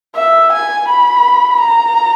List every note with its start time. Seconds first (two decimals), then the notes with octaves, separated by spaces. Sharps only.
0.16 E5
0.52 G#5
0.88 B5
1.60 A#5